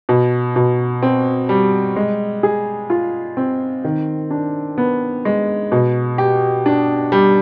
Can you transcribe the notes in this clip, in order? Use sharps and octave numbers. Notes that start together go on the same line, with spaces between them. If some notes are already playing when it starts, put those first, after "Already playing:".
B2
B2
C4
G3
G#3
G#4
F4
C4
D#3
D4
B3
G#3
B2
G4
D4
G3